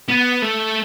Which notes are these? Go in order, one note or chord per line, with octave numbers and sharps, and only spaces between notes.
B3
A3